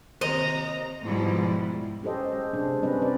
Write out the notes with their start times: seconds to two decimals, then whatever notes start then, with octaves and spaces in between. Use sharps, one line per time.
0.21 D#2 C3 C5 D#5 A#5
1.03 G#2 B2 F3 G3 G#3 E4
2.03 C#4 G4 A4 C5 D#5
2.33 G#3
2.53 C3 G#3 D4 C5
2.83 G3 C4 C#4 G4 B4 D#5
3.02 C4 D#4 G4 B4 D5